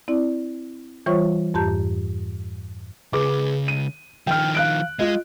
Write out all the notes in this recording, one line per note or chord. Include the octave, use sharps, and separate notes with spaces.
C4 E4 D5
E3 G3 F4 C5 C#5 C#6
F2 G#2 G4 A5 A#5 G6
C#2 C#3 G#4 B4 D6
D#7
D#3 F3 G5 F6
F5 F#6 D7
G#3 F4 D#5